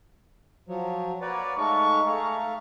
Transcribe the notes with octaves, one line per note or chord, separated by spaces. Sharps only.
F3 F#3
A#3 B4 C#5 D5 F#5 A#5
G#3 A3 D#4 F5 A5 C#6
A3 G#4 F5 A#5 C#6